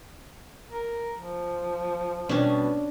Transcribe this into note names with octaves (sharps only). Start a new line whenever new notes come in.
A#4
F3
B2 G3 C#4 D4